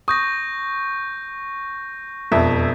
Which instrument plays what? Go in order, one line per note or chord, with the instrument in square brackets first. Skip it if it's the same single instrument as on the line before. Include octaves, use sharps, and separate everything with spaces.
[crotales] C#6 G6 A#6 [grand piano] D#6
[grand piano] E1 F2 E5